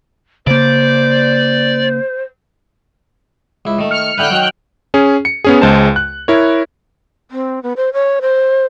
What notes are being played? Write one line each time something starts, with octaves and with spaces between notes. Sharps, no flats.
C#3 A#3 C5 D5
C#2 E4
D#3 A3
F6 C#7
D3 E4 B4 G5 F6 F#6
D#3 F#3
C#4 G#4
C#7
B3 C#4 G#4
C#2 G#3 C5 A5
F#6
E4 A#4 C#5
C4
B3
C5
C#5
C5